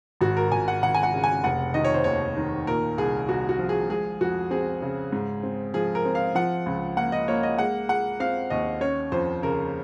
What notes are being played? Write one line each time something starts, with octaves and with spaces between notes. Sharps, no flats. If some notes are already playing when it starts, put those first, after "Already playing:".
G#1 F#4
A#4
G#1 G#5
F#5
G#1 F#5
G#5
F#5
C#3
G#5
F1 F#5
D#3 D#5
C#5
C5
D#2 C#5
D#3
A#2 A#4
C2 G#4
C2 F#4
F#4
F3
G#4
G#3 G#4
F2 F#4
C4 G#4
C#3
G#2
C4
F3 G#4
A#4
C4
F5
F3 F#5
C#2
A#3 F#5
D#5
A#3 C#5
D#5
G#3 F#5
G#3 F#5
C4 F5
D#2 D#5
C#4 C#5
F2 C5
C#3 A#4